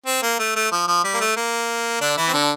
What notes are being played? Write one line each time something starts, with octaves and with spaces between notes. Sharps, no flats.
C4
A#3
A3
A3
F3
F3
G3
A#3
A3
A#3
D3 D4
E3 E4
C4
D3 D4